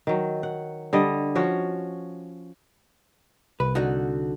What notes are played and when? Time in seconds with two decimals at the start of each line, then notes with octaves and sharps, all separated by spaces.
0.07 D#3 F#3
0.43 F#5
0.93 D3 G3 D#5
1.35 F3 C#4 F#4 C#5
3.60 C2 B4
3.75 D3 D#4 F#4